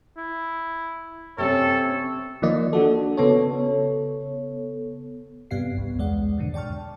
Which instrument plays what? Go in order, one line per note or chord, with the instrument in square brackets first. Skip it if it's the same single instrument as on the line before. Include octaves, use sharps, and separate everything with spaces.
[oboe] E4
[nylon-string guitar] C3 C4 C#4 [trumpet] A4 [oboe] C#5
[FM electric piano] D#3 F3 A#3 D5 D#5
D4 F#4 A4
C#3 B3 A4 C#5
G2 C3 B3 G4 F5 C7
C2
E2 G#3 D5 F#5
F2 G#2 B2 D3
D5 G5 A5 C#6 F6